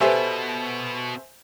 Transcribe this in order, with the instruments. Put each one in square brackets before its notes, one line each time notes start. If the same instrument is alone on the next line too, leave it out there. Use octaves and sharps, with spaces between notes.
[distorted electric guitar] B2 [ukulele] G4 A4 B4 [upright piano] C5 E5 G#5